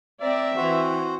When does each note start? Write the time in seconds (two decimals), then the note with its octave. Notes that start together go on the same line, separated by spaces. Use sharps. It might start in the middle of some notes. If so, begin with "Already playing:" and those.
0.22 C4 D5 E5 A#5
0.56 E3 F#4 C5